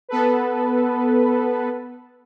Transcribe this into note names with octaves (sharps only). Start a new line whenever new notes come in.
B3 A4 B4